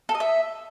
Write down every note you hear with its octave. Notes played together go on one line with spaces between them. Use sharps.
A4
D#5
E5